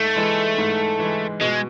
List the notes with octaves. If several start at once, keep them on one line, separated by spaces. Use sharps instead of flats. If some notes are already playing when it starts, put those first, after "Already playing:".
Already playing: G#2 A3
E3 G#3
G#2
E3 G#3
B2 G#3